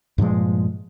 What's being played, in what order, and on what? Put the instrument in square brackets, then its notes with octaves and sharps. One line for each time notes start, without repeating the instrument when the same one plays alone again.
[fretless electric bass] G2 A#2 F3 G#3